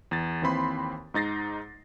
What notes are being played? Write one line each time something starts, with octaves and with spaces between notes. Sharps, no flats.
E2 A6
D#2 E3 C4 B5 C6
G#2 D#4 A6 A#6 C7